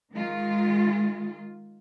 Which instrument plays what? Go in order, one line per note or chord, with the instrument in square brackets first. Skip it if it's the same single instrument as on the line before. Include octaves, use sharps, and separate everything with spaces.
[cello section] D#3 G#3 F4